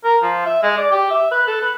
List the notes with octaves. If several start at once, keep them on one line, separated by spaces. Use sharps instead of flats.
A#4
F3
E5
G#3
D5
G4
E5
B4
A4
B4